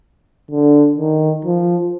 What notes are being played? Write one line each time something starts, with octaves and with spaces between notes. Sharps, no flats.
D3
D#3
F3